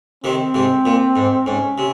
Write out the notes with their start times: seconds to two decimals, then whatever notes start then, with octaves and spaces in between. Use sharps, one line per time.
0.24 C3 D#3 C4
0.54 G#2 C3
0.85 A#2
1.16 G#2
1.46 G#2 C#4
1.78 C3